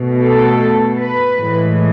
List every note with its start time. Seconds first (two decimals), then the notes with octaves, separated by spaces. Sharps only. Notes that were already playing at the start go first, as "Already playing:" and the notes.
Already playing: B2 A3
0.21 A4
0.99 B4
1.37 A2 E3 G#3